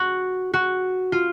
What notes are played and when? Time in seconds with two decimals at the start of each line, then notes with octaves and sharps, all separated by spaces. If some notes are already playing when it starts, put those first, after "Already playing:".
Already playing: F#4
0.54 F#4
1.12 F4